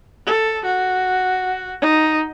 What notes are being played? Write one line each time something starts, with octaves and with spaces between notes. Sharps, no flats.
A4
F#4
D#4